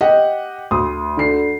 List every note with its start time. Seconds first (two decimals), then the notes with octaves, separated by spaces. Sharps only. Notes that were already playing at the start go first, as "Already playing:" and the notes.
0.01 G4 D#5 F#5
0.71 D2 C6 D#6
1.17 D3 C7